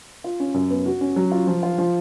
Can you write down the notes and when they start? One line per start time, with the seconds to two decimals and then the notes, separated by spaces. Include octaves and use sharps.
0.24 F4
0.40 C#4
0.54 F#2
0.70 B3
0.86 F#4
1.01 C#4
1.16 F#3
1.32 F4
1.47 F3
1.63 F4
1.78 F3